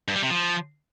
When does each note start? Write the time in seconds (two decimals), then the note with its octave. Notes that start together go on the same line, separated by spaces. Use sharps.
0.08 G2
0.16 G3
0.23 C3
0.30 F3